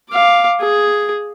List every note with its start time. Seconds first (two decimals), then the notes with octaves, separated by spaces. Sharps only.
0.10 F5 D6
0.61 G#4